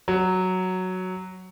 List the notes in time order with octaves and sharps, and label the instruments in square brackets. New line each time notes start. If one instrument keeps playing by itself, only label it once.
[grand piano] F#3